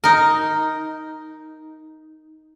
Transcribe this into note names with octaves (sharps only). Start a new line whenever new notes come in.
D#4 A#4